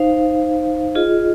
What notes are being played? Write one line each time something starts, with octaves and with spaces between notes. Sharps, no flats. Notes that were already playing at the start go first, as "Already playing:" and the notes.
Already playing: D#4 C5 F5
F4 G#4 D#5